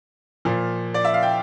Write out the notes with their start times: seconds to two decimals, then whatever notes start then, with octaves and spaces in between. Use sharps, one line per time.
0.45 A#2 F3
0.94 D5
1.05 E5
1.14 F5
1.23 G5